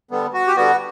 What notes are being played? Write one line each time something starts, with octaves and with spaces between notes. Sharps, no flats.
D3 G3 B3
F#4
G4
D3 G3 B3 F#4